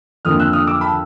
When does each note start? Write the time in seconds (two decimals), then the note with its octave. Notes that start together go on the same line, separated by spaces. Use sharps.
0.25 F2 D3 F3 A#3 D#6 F6
0.40 E6 F#6
0.53 D#6 F6
0.67 D6 E6
0.81 A5 B5